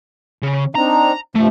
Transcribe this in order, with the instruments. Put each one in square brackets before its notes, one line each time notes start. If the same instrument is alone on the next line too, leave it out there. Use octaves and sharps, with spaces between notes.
[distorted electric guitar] C#3
[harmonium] C4 D4 D#4 [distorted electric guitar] A#5
[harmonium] G2 C3 F3 [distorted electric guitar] A3